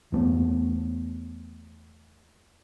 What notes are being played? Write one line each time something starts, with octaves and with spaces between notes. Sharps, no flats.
E2 A3 B3